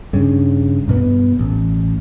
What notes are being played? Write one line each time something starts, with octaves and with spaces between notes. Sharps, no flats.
G2 C#3
G2 B2 B3
A1